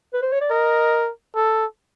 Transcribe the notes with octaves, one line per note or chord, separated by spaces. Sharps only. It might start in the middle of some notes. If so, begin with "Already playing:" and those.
B4
C5
C#5
D5
A#4 D#5
A4